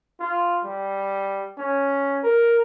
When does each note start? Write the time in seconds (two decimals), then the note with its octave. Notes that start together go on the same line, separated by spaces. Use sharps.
0.20 F4
0.65 G3
1.58 C#4
2.23 A#4